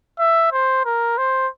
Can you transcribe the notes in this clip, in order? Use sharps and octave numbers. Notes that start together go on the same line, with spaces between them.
E5
C5
A#4
C5